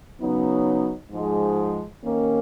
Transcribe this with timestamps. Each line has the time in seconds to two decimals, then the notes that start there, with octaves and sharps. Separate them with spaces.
0.20 C#3 F#3 B3 D#4
1.11 G#2 F3 G#3
2.02 D#2 D#3 A#3 C#4